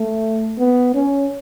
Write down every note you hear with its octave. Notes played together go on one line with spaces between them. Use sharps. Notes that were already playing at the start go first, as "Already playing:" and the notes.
Already playing: A3
B3
C#4